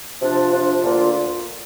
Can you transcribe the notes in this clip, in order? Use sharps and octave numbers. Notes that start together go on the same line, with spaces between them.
C3 F3 D4 F4
C3 F3 D4 F4
D2 D3 A#3 D4 F4